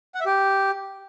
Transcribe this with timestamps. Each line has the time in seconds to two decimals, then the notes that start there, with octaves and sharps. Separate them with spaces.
0.15 F#5
0.20 E5
0.26 G4